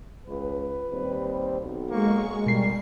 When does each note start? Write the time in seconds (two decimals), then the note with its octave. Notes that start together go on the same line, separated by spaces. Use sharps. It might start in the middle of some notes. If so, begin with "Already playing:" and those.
0.27 C#2 B4
0.90 D#2 G3 C4
1.60 B1
1.90 G#3 A#3 C#6
2.46 B2 G3 A#4 C7